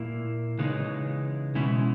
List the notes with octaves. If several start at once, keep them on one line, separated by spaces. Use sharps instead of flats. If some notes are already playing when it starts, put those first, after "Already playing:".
Already playing: A#2 A#3 E4
C#3 E3 G#3 D#4
B2 G#3 C#4 E4